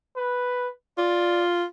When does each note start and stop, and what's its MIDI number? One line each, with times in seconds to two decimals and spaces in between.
0.16 0.68 71
0.98 1.65 65
0.98 1.44 74